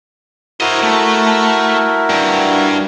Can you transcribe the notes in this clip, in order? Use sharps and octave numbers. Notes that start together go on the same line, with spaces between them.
E4 F#4 A#4 C5 D#5
A3
G2